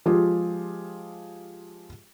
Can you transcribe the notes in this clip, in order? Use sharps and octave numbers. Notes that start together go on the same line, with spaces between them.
F3 G#3 F4 G4 G#4